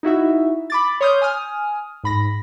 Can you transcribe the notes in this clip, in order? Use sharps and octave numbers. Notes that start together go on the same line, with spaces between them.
D#4 E4 F#4 E5
B5 D6 A6
C#5 C6 D#6 F6 G6
G#5 D#6 F6
G#2 B5 A#6